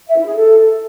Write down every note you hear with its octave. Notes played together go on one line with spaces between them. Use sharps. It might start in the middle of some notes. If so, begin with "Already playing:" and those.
E5
E4
G#4
A4